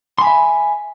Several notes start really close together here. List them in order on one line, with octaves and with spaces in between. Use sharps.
C6 G#5 B5 E5